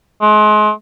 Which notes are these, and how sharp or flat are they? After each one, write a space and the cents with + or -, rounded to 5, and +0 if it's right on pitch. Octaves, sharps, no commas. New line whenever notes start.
G#3 +35